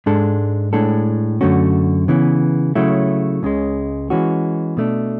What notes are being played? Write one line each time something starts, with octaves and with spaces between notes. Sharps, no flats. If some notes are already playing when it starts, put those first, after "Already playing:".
G#2 G#3 D4 A4
A2 G#3 D4 A4
F#2 D3 A3 C#4 F#4
C#3 E3 B3
C#3 F#3 A3 E4
C#2 C#3 G#3
E3 G#3 C#4 F#4
B2 A3 D4